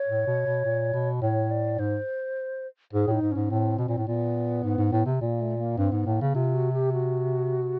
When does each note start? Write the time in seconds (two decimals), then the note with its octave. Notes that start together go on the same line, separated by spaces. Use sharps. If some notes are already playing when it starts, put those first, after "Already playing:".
Already playing: C#5
0.08 A2
0.27 B2
0.46 B2
0.65 A#2
0.93 B2
1.22 A2 C#5
1.51 D5
1.79 G#2 C5
2.93 G#2 G#4
3.07 A2 D#4
3.21 G#2
3.32 G#2 C#4
3.50 A2 C4
3.78 B2
3.88 A#2
3.98 A2
4.07 A#2 B3
4.64 G#2
4.78 G#2
4.93 A2
5.06 C3
5.21 A#2 A#3
5.41 A3
5.58 A#3
5.78 G2 C4
5.92 G#2 B3
6.06 A2 A#3
6.21 C#3 B3
6.35 C3 F4
6.54 F#4
6.73 G4
6.92 F#4